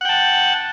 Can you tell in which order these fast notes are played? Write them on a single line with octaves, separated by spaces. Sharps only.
F#5 G5 A5